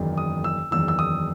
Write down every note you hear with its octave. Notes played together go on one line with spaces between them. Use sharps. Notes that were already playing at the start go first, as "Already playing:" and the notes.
Already playing: F#1 E2 D#3
D#6
E6
F#1 E2 D#3 E6
E6
D#6